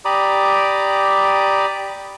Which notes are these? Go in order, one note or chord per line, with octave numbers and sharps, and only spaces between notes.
G4 D5 A#5 B5 D6 D#6